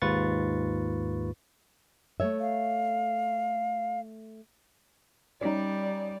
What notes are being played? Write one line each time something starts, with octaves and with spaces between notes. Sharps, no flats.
D#2 G#2 F4 B4 C#6 A6
A3 C#5 E5
F5
G3 C#4 D#4 D5